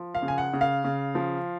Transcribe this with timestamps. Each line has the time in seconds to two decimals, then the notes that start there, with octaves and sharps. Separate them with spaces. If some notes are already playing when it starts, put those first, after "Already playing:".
Already playing: F3
0.15 F5
0.22 C#3
0.28 G#5
0.38 F#5
0.53 C#3
0.61 F5
0.84 C#3
1.15 F3